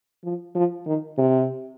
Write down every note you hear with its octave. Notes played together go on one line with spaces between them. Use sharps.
F3
F3
D#3
C3